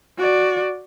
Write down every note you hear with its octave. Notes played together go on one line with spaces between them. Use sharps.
F#4 D5